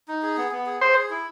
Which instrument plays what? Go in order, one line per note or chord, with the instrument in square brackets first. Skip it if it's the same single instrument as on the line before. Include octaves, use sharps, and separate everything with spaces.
[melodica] D#4
G#4
B3
B3
G#4
[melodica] G#4 [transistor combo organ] C5
[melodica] G#4
E4